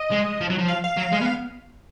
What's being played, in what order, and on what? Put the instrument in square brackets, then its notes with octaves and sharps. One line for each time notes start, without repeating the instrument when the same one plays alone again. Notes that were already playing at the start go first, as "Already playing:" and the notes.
Already playing: [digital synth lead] D#5
[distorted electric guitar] G#3
F3
F#3
F3
[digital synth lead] F5
F5
[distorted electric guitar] F#3
G#3
B3